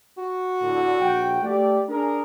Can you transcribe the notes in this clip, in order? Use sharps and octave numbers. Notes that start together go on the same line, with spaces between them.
F#4
A2 D3
A#1 F#5 G5
A3 G4 D5
D4 G#4 A#4